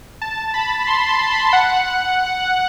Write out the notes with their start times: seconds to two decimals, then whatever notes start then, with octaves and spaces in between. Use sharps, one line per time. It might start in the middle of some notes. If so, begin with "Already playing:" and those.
0.22 A5
0.54 B5
0.87 C6
1.09 C6
1.31 B5
1.53 F#5